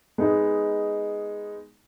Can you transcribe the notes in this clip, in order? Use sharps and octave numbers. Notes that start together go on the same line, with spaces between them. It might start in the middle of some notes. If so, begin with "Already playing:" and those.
G#3 B3 D#4